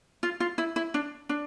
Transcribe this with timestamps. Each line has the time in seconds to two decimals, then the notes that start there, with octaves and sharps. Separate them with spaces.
0.23 F4
0.40 F4
0.58 E4
0.76 E4
0.94 D4
1.29 D4